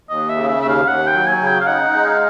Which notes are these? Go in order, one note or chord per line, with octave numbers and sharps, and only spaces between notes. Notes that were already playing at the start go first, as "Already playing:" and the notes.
D#2 D#5
E5
C#3
E5
D#2 E5
F5
D#2 F#5
G5
F#3
G#5
C#3
G5
F5
D#4 F#5
G#3
F5